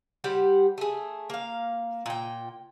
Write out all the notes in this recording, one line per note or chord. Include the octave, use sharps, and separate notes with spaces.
G3 G4 C5 F#5
A3 G#4
A#3 F5
A#2 G5